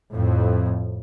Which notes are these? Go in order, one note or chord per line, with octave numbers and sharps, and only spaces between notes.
F2 A2